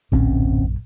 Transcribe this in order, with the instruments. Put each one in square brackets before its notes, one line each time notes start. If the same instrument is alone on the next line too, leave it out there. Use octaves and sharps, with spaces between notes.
[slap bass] D1 C4 C#4 [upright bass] A#1 F#2